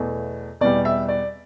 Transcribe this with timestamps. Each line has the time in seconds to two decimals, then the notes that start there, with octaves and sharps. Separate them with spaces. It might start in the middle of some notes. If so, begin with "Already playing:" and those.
Already playing: E2 B2 A3
0.61 E2 B2 G3 D5
0.85 E5
1.09 D5